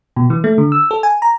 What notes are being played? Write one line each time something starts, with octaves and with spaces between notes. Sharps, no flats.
B2
E3
A3
D3
E6
A4
G#5
A#5